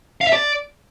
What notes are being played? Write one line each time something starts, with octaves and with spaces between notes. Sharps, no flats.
F5
E5
D5